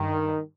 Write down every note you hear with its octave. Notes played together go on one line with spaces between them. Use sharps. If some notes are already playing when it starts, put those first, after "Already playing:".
Already playing: G2 D#3